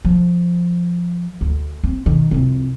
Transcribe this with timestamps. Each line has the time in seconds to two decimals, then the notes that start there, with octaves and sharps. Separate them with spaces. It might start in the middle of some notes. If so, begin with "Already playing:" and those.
0.05 F3
1.41 D2
1.84 C4
2.06 B2 D#3
2.31 C2 F2